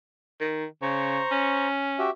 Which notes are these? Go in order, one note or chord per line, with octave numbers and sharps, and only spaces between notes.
D#3
C#3 C5 A#5 C#6
C#4
F#4 G4 E5